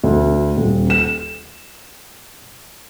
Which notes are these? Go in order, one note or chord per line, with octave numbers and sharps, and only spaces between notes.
D2
D#1
E7